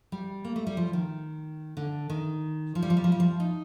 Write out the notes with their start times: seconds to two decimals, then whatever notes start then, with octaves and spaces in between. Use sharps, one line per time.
0.12 G3
0.45 A#3
0.56 A3
0.67 G3
0.77 F3
0.93 D#3
1.77 D3
2.10 D#3
2.75 F3
2.82 G3
2.90 F3
2.97 G3
3.04 F3
3.12 G3
3.20 F3
3.40 D#4